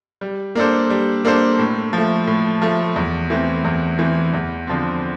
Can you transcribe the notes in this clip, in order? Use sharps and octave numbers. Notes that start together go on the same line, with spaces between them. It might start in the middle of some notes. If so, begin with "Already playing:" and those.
G3
A#3 D4 A4 C5
G3
A#3 D4 A4 C5
A2
F3 A3
A2
F3 A3
E2
E3 A3 C4
E2
E3 A3 C4
E2
D3 F3 C4